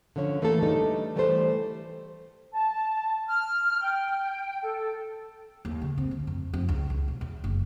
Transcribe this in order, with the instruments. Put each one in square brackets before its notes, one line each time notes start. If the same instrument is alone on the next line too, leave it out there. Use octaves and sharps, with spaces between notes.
[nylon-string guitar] D3 F3 C#4 C#5
E3 A3 A#3 E4 A4
G3 A3 D4 D#4 A4
E3 G3 A3 G4 A4 C5
[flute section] A5
F6
G5
A4
[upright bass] D#2
C#3
C4
D2
F2
F2
C#2
E3
B2
E2
F#1